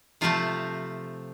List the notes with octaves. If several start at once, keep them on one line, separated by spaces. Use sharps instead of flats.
C3 F3 A3 C4 F4